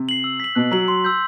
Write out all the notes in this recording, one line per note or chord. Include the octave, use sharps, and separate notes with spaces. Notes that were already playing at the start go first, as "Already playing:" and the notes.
Already playing: C3
C7 F#7
E6
B6 F#7
B2 F#6
F#3 B6 F#7
C6
E6 G6 B6